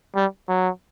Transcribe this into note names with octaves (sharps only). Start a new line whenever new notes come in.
G3
F#3